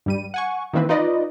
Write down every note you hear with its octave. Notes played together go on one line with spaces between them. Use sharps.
G2 G3 D#7
F#5 G#5 C#6
D#3 E3 A#3 C4 B4
D#4 F4 B4 D5 D#5